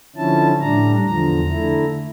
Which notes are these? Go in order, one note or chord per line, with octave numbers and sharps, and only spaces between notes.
D3 F3 C#4 E4 A5
A2 G3 D4 A#5
E2 D3 F3 A#5
D3 A3 E4